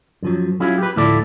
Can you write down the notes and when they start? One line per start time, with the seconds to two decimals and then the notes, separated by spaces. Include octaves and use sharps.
0.23 F#2 F3 F#3
0.60 F#3 C#4 E4 F4 G#4
0.78 G4 B4
0.96 D2 A2 F3 E4 A4 D5